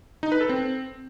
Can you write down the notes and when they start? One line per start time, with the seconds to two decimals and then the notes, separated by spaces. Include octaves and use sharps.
0.23 D#4
0.32 B4
0.41 A4
0.49 C4